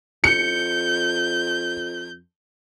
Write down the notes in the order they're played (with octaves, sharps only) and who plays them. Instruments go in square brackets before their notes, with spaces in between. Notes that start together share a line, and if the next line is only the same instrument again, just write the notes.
[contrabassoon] F2 [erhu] G6 [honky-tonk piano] C#7